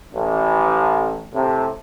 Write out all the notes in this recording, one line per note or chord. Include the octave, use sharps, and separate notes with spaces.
A1
A2 C3